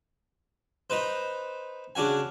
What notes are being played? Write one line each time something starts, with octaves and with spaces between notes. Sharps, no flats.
D#4 B4 C5
C#3 D4 F#4 G#5